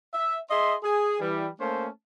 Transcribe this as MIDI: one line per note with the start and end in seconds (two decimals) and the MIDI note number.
0.14 0.37 76
0.51 0.74 68
0.51 0.74 75
0.51 0.74 76
0.51 0.74 84
0.84 1.19 68
1.21 1.47 52
1.21 1.47 55
1.60 1.89 57
1.60 1.89 58
1.60 1.89 61
1.60 1.89 72
1.60 1.89 81